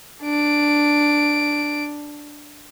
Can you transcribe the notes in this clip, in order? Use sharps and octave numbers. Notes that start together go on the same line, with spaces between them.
D4 D7